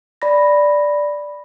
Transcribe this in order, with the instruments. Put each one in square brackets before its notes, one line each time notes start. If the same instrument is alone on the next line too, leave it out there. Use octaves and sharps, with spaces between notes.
[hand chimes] D5 B5 A#6